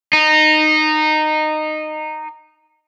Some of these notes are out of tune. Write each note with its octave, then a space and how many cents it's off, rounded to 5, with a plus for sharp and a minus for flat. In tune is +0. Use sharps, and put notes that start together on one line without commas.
D#4 -15